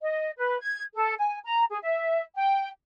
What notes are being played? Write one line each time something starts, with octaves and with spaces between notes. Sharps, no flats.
D#5
B4
G#6
A4
G#5
A#5
G#4
E5
G5